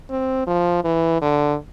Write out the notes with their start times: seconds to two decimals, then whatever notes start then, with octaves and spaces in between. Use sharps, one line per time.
0.10 C4
0.47 F3
0.84 E3
1.22 D3